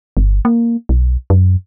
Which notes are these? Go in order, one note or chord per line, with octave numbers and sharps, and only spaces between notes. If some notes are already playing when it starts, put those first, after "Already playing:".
G1
A#3
B1
F#2